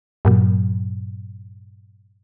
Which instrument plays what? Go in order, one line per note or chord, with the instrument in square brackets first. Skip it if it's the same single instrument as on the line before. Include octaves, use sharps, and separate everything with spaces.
[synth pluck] G2 A#2 F#3